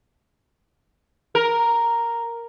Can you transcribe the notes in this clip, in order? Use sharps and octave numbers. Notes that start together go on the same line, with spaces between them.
A#4